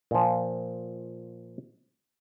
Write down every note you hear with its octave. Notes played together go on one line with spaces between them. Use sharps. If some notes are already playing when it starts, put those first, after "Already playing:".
A#2 F3